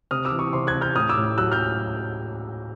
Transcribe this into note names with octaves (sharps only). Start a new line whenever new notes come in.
C3 D#6 F6
D6 E6
E3
C#6 D#6
C3 C6 D6
F#6 G#6
C3
F6 G6
A2 D#6 F6
D6 E6
A2
F#3 E6 F#6
F6 G6